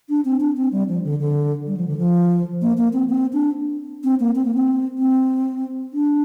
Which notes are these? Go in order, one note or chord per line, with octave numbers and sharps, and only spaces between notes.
D4
C4
D4
C4
G3
F3
D3
D3
G3
F3
D3
F3
A#3
A#3
C4
C4
D4
C4
A#3
C4
A#3
C4
C4
D4